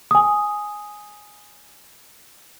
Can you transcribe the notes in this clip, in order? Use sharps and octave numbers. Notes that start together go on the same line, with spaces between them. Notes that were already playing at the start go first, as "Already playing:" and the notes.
G#5 D#6